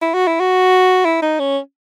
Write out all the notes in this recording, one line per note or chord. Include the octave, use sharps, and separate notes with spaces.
E4
F#4
E4
F#4
E4
D#4
C#4